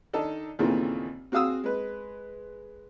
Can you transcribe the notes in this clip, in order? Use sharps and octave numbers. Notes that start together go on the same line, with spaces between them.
D#3 D4 D#4 A4
D#2 A#2 C#3 E3 A3 C4
C4 F#4 G#4 F5 D#6 E6
G#3 B4